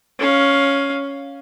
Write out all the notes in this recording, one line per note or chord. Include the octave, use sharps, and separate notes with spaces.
C#4 F5